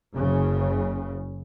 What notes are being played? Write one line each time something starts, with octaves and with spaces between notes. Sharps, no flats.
F#1 C#3